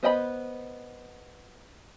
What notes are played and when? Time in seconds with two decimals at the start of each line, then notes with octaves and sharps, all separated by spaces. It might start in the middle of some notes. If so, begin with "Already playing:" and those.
0.03 B3 C5 D#5 G5 B5